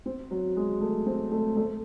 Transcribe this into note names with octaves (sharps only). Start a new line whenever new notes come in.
C4
F#3
G#3
A3
C4
A3
A3